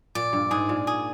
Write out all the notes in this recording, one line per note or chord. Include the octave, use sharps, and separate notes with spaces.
A#2 D5
G2
G#2 G#4
A#2
G#4